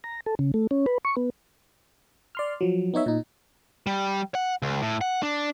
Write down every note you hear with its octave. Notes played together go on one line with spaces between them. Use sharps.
A#5
A4
C#3
A3
C#4
B4
C#6
B3
D5 C6 F6
F3 F#3
B3 D#4 C#5 E5
A#2 D#4
G3
F#5
C#2
A2
F#5
D4